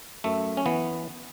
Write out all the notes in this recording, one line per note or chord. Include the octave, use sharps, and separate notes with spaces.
F#2 A3
C#4
E3 B3